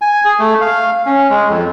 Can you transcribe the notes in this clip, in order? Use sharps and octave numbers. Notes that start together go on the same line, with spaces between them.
G#5
G#4
A3
F5
C#4
G#3
F2